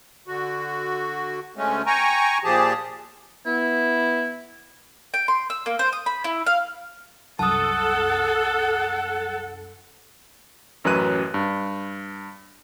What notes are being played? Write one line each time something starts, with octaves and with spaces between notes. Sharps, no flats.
D3 F#4
D2 G#3 A3 C#4
G5 G#5 A#5 C#6
A#2 F3 G4 G#4 A5
B3 E4
G5
C6
E6
A#3
C5
D#6
B5
E4
F5
C2 F#2 A4 F#5 A5 D#6
A1 F#2 F#3 B4 F#6 D#7
G2